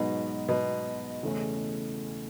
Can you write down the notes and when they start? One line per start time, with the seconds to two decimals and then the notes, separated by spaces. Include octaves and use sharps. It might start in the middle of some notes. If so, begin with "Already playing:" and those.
Already playing: G#2 B2 F#3 B3 D#4
0.48 B2
1.23 E2 C#3 E3 A3 C#4